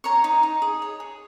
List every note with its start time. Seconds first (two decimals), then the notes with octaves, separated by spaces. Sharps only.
0.04 C#5 A#5 C#6
0.24 D#4
0.43 D#4
0.62 G#4
0.82 C#5
1.00 G#4